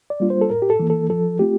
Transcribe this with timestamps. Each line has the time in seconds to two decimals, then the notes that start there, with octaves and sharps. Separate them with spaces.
0.10 D5
0.20 G3 A#3 D4 F4
0.30 C5
0.41 A4
0.50 A2 A#4
0.62 G4
0.70 A4
0.80 E3 A#3
0.90 A4
1.10 F3 A4
1.39 A3 C4 F4 G4